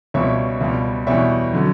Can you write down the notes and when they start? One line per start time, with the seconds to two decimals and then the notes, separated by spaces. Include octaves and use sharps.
0.14 C#2 B2 G3 C#5 E5
0.61 C#2 B2 G3
1.07 E2 B2 G3 C#5 E5
1.53 D3 F#3